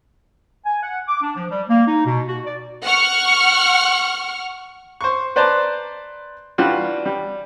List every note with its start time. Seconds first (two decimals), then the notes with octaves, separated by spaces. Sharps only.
0.66 G#5
0.83 F#5
1.08 D6
1.22 D4
1.37 F3
1.51 G3
1.69 A#3
1.87 D#4
2.06 B2
2.28 F#4
2.46 D5
2.82 F#5 C#6 F6
5.01 C5 C#6
5.36 B4 C5 D5 A5 A#5 C6
6.58 E3 G3 D4 F4 F#4
7.06 G3